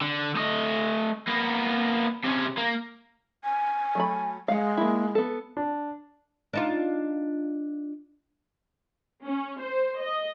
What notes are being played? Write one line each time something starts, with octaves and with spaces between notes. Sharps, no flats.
D3
A3 D#5
A#3 B3
C3 C#4
A#3
G#5
F#3 A3 B5
G#3 F5 F#5
A#3 E4
B3 A4
D4
D4 D#4 F4
C#4
C5
D#5